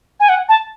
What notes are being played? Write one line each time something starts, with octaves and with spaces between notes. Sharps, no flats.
G#5
F#5
A5